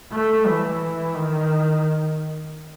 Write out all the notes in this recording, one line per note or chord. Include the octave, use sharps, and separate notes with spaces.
A3
E3
D#3